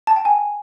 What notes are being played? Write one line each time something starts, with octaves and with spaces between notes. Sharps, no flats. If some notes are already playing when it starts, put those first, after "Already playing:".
A5
G5
G#5